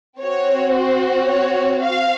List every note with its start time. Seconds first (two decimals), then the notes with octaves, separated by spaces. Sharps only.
0.21 C4 F#4 C#5
0.74 C5
1.28 C#5
1.83 F5